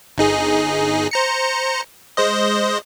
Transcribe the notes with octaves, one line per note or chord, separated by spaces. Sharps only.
G1 D#4 G#4
C5 A#5 C#7
G#3 C5 D#5